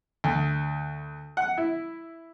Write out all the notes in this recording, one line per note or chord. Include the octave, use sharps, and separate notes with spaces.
D2
F#5
E4